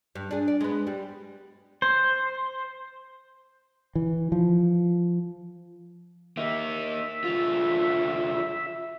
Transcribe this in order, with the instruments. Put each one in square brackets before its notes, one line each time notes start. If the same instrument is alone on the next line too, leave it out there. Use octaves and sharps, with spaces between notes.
[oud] G2
D4 G#4
D5
G#3 B3
G3
[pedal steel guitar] C5
[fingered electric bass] E3
F3
[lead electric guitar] A#3 D#4 [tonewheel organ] E5
[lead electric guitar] D2 F4